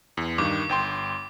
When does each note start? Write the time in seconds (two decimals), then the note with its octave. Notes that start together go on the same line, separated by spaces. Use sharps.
0.17 E2
0.38 G2 D#3 D6
0.69 G1 G5 C6